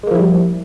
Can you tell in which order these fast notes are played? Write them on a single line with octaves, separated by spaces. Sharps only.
G#3 A#3 F3 E4 G3